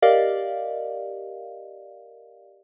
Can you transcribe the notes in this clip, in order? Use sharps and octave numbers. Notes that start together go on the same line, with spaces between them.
G4 A#4 D5 D#5 F5